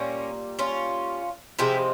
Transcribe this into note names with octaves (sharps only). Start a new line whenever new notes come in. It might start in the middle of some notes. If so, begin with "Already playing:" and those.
Already playing: A#2 G3 A#3 C#4
C#4 F4
C3 F3 G#3 E4 G4